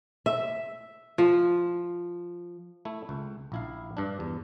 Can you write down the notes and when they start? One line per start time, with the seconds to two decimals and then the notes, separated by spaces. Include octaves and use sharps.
0.26 E5
1.18 F3
2.85 A3 E4
3.09 C#2
3.52 A#1 E4 F5
3.97 G2 D4
4.20 E2